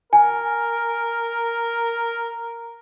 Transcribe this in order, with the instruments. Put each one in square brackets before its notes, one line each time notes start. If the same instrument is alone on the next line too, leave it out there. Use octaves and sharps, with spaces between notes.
[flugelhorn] A#4 [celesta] G#5